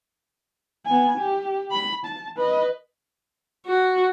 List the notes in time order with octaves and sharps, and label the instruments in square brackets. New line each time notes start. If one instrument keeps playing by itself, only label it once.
[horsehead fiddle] B3 G#5
G4
B5
A5
B4 D#5
[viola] F#4